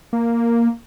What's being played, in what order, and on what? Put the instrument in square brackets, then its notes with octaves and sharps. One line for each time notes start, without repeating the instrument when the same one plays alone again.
[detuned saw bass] A#3